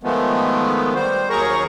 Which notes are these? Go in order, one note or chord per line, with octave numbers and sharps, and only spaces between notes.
D#3 F3 G#3 A3 B3
G3 C5
D#2 F#3 G#4 A#4 A#5 C#6